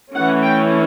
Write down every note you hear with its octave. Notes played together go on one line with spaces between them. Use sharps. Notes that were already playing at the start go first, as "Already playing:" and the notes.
E3 A3 C#4 F#5
G5